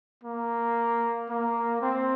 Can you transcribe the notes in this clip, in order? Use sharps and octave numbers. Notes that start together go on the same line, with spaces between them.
A#3
A#3
C4